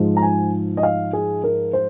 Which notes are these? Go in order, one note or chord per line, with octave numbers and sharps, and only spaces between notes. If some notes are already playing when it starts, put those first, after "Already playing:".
Already playing: G#2 F3 G#3
A#5
G#5
D#5
F5
G#4
A#4
C5